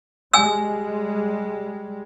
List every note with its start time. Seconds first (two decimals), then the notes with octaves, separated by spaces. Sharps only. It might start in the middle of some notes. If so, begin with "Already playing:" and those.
0.33 G3 G#3 G#5 E6